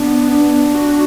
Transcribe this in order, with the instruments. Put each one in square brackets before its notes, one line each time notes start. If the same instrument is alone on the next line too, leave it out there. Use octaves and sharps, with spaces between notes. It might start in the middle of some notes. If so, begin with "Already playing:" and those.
Already playing: [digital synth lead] B3 [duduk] D4
[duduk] D4
[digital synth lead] F#4